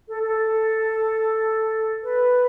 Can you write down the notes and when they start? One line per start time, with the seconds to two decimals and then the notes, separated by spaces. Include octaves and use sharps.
0.08 A4
0.23 A4
2.03 B4